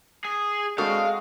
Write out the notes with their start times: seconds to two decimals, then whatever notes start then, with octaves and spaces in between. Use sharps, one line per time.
0.24 G#4
0.78 G#3 C4 D4 F#4 A4 F5 C#6 D#6